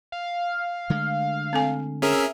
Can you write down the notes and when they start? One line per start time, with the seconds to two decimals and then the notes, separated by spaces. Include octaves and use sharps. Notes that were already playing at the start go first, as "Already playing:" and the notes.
0.12 F5
0.90 D3 G#3 A3
1.53 C4 A4 G#5
2.02 C#4 G#4 A#4 E5